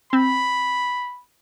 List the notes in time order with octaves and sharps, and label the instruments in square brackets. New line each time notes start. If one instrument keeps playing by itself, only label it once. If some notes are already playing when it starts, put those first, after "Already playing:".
[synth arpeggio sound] C4 [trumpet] B5